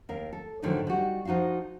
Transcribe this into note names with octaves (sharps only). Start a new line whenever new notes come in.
D#2 A#4 F5
A4
G#2 D3 D#3 F3 F#3 A3
G3 D#4 F#4
F3 D#4 F#4 D#5 F5